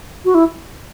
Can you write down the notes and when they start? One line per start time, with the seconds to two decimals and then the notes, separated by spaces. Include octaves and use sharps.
0.25 F#4
0.34 E4